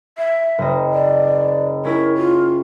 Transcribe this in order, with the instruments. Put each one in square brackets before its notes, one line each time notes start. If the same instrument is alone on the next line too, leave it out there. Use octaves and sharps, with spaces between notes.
[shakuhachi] E5 [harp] C7
[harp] F#1 D#5
[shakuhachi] D5
[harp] C#4 E4 [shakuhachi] A#4
[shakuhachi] F4